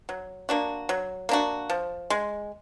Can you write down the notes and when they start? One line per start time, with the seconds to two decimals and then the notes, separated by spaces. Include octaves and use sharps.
0.09 F#3
0.49 A#3 D4 F#4
0.89 F#3
1.29 A#3 D4 F#4
1.70 F3
2.10 G#3